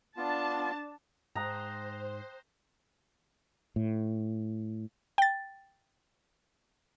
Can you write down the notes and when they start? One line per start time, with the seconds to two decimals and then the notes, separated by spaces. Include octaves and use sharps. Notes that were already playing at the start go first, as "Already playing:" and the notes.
0.17 B3 D4 F4 A5
1.35 G#2 C5 G5 A#5 D#6 F#6
3.76 A2
5.18 G5 A6